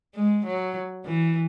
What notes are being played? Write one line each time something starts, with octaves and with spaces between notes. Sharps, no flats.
G#3
F#3
E3